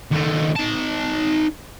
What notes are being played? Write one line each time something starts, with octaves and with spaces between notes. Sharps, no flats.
D#2 A3
D#4 A5